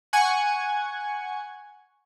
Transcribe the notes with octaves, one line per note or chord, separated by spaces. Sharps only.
F#5 G#5 C#6 G#6